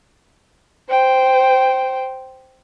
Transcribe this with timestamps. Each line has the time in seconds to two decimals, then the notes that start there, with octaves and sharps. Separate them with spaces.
0.89 C5 G5